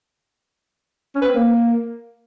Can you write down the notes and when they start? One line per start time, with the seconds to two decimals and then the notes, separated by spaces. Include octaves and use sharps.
1.15 C#4
1.22 B4
1.28 C4
1.34 A#3